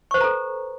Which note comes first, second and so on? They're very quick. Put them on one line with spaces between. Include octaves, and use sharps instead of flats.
C#6 C5 B4 A#5 A4